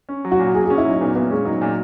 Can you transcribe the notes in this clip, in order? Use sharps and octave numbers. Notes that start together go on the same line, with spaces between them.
C#4
F#3
F#4
A#2
A#2 G#4
C#4 G#4
E4
F#3 D#4
A#2 B3
A#2 B3
G#3 C#4
F#3 D#4
A#2